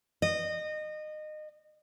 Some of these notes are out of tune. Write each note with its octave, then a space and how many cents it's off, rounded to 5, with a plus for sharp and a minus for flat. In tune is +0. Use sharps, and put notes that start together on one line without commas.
D#5 -25